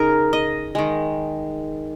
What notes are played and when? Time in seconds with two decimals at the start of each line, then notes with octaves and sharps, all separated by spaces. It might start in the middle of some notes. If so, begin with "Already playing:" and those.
Already playing: C#3 D#4 G#4 A#4
0.33 D#5
0.75 D#3 G#3